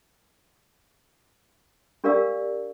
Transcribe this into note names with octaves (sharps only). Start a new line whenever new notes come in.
D4 G4 A#4 D5 F5 E6